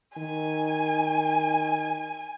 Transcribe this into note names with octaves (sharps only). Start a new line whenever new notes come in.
D#3 G#5